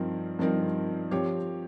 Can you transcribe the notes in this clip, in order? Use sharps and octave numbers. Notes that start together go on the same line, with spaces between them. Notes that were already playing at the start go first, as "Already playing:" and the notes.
Already playing: G2 F3 C4 D#4 A#4
G2 F3 C4 D#4 A#4
F3 C4 G4 C#5